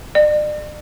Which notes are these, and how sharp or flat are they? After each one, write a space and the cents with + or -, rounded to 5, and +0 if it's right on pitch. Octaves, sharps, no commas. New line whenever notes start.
D5 +40